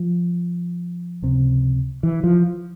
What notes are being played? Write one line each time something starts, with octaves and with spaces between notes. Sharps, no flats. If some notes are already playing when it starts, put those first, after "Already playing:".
Already playing: F3
C#2 C3
E3
F3